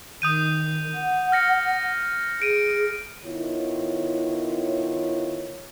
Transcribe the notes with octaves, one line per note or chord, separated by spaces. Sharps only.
D#3 D#6 G6 D#7
F#5
F6 A#6 C#7
G#4 D7 D#7
D#3 B3 E4 F4 C#5